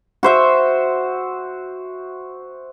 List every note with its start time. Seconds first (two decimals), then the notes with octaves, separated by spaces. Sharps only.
0.23 F#4 C5 E5